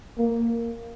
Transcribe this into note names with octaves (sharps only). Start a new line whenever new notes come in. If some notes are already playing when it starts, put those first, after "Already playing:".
A#3